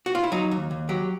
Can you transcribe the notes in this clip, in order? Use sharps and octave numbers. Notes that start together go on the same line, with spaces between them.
F#4
F4
E4
F#3 D#4
D#2
D#2
F#3 G4